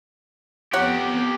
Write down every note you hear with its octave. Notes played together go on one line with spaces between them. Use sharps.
F2 B3 G4 A#4 C#5 F#5 F#6